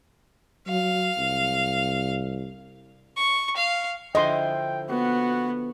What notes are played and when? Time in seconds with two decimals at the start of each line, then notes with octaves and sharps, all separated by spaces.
0.68 F#3 F5
1.19 C2
3.16 C#6
3.57 F5
4.15 D3 F3 E4 D#5 G5 C6
4.89 B3 F#4